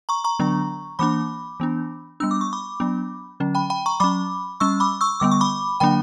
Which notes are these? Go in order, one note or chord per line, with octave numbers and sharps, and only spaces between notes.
A#5 C#6
A#5 C#6
D3 F#3 B3 D4
E3 A#3 D4 B5 D6
E3 B3 D4
G3 B3 D4 E6
D6
C#6
B5 D6
F#3 B3 D4
D3 F#3 C#4
G5 B5
G5 B5
A#5 C#6
F#3 C#4 B5 D6
G3 C#4 C#6 E6
B5 D6
C#6 E6
D3 G3 B3 D6
C#6
B5 D6
D3 F#3 A#3 D4 G5 B5